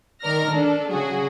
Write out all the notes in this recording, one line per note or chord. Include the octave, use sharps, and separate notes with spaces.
D#3 A#4 D5 F6 A#6
D4 A4
C#3 F#3 F#4 G#4